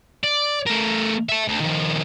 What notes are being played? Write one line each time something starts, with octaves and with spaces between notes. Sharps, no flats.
D5
A3 A#4
E5 A5
D2
D#3 F3